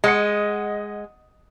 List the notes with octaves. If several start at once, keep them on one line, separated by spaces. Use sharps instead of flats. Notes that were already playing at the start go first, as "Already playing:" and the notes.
G#3 D#5 F#5 C#7